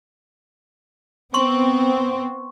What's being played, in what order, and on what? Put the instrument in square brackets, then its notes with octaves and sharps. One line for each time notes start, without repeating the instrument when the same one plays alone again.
[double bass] B3 [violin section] C4 [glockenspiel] C6 C#6